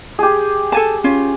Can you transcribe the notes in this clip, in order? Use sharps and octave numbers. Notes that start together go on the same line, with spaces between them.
G4 G#4
A4 G#5 A5
C#4 F4